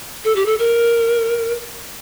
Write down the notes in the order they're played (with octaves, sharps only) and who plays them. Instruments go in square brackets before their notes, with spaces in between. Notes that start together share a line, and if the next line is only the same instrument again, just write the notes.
[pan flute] A4
G4
A4
A#4